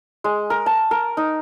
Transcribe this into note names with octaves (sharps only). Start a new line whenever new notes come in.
G#3
A#4
A5
A#4
D#4